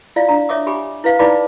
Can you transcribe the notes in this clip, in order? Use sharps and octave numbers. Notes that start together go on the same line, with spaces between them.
E4 F4 D5 F5
D4 A#5
C#5 E5 D6 D#6
G4 G#5 B5 D6
E4 B4 F5
D#4 E4 B4 D5 B5 D6